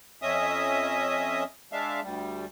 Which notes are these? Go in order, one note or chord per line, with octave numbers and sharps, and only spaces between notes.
F2 C#4 D#5 E5 D#6
G#3 D4 E5 F5
D2 G3